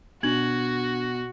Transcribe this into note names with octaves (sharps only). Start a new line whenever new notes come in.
B2 D4 F#4 G#6 F#7